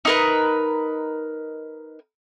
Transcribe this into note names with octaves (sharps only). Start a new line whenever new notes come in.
D#4 A#4 B4